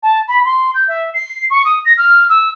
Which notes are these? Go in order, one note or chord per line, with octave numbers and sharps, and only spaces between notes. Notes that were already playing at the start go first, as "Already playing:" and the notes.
A5
B5
C6
G6
E5
C7
C#6
D#6
A#6
F6
E6